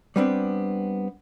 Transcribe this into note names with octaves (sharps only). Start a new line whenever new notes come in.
G3 B3 C4 D4